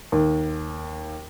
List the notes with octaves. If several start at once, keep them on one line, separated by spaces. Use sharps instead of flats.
D#2